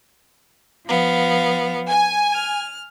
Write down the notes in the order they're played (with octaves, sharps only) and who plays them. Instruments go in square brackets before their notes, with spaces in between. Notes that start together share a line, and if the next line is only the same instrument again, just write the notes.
[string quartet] F3 B3 F5
[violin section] G#5
[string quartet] F6